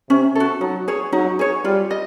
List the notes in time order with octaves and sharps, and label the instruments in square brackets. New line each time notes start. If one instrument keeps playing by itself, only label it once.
[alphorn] C3 [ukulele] C#4
[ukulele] F#4 A4
[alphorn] F#3 [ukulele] D#4
[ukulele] G#4 C#5
[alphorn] F#3 [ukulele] D#4
[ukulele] G#4 C#5
[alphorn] G3 [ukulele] F4
[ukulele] D#5